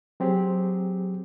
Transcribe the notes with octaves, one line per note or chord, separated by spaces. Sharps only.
F#3 C4 G4 G#4